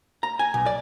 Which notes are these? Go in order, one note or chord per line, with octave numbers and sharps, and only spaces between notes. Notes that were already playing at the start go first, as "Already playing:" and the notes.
A#5
G#5
B1
D5